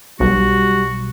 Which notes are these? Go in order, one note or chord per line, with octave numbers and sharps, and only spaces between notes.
B1 G3 F#4